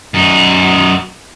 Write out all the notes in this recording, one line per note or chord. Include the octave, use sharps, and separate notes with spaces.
F#2 D#4